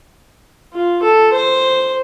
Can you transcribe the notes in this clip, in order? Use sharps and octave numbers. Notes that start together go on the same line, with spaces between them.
F4
A4
C5